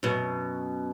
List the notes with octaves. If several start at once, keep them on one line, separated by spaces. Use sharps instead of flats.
F#2 B2